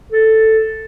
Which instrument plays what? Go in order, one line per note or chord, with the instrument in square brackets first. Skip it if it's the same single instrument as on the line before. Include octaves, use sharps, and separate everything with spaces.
[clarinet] A4